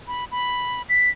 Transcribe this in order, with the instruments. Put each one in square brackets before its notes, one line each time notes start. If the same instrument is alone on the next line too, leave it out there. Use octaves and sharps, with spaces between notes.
[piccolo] B5
B5
B6